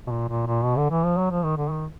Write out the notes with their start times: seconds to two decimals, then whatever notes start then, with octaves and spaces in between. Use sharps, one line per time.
0.07 B2
0.11 A#2
0.29 A#2
0.47 A#2
0.64 B2
0.77 D3
0.90 E3
1.04 F3
1.17 F#3
1.31 F3
1.44 D#3
1.57 D3
1.70 D#3